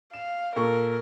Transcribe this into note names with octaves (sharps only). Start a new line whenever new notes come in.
F5 E7
A#2 A4 A#4 C#6